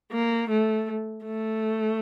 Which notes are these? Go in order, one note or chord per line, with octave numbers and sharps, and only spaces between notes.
A#3
A3
A3